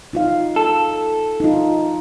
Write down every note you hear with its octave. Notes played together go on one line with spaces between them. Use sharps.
D#4 F4 F5
A4
D#4 F4